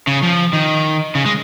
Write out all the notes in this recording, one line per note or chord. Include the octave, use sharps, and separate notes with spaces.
C#3
F3
D#3
C#3
G#3